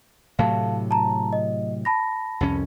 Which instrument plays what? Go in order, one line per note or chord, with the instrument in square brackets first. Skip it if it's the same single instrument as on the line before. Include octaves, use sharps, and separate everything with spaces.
[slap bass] A2 C3 F#3 [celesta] F5 A5
[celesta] A5 A#5
D#5
A5 B5 A#6
[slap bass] C2 F2 C#4